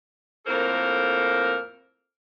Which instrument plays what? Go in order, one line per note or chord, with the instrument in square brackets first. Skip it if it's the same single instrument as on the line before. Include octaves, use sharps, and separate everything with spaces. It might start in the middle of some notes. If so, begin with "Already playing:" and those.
[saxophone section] F2 A2 A#3 A4 A#4 C5